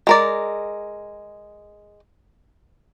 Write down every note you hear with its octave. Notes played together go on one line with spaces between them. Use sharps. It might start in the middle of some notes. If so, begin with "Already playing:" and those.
G#3 A#4 D5